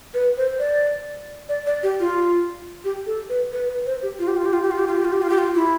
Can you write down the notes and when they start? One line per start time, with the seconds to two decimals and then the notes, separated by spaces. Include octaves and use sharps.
0.14 B4
0.37 C5
0.59 D5
1.49 D5
1.66 D5
1.83 G4
2.00 F4
2.84 G4
3.06 A4
3.29 B4
3.52 B4
3.69 B4
3.86 C5
4.03 G4
4.19 F4
4.28 G4
4.37 F4
4.45 G4
4.53 F4
4.62 G4
4.71 F4
4.79 G4
4.88 F4
4.97 G4
5.05 F4
5.13 G4
5.22 F4
5.30 G4
5.38 F4
5.55 E4